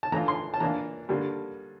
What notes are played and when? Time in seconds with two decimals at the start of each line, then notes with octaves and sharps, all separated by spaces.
0.03 A5
0.12 E3 A3 D4 F4 A#5
0.28 C6
0.54 A5
0.60 E3 A#3 D4 F4 A#5
1.09 G2 D3 G3 A#3